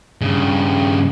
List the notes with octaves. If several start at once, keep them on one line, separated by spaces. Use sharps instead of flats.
G2 C#3